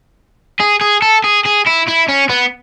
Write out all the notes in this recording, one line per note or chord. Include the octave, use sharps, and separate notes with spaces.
G#4
G#4
A4
G#4
G#4
E4
E4
C#4
B3